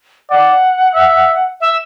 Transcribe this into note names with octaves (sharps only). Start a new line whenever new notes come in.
D5 F#5
E5
E5